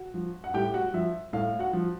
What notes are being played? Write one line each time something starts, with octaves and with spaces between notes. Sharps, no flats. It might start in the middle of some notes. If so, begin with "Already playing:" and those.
Already playing: F#4
F3
F#5
A2 G4 G5
F#4 F#5
F3 E5
A2 F5
F#4 F#5
F3